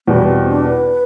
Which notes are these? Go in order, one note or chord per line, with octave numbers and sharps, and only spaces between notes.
E2 B2 G3 B3
C4
D4
B4